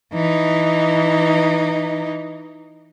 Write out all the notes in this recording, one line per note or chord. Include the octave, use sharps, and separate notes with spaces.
E3 D#4